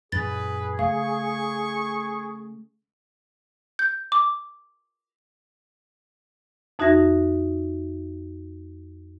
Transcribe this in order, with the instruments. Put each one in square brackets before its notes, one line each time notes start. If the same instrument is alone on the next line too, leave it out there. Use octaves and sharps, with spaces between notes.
[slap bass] F#2 A#2 E3 [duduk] G#4 [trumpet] B4 [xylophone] A6
[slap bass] C#3 A3 [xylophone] F5 [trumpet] C#6
[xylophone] G6
D6
[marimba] F2 D#4 F#4 E5 G#6 A#6